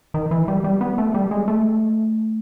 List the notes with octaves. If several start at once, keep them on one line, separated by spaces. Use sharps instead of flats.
D#3
E3
G3
G3
B3
A3
G3
G#3
A3